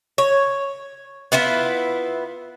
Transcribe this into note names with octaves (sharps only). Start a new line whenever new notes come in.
C#5
B3 E4 F4 B4